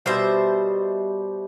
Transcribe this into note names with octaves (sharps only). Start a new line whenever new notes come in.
B2 G3 C5 E5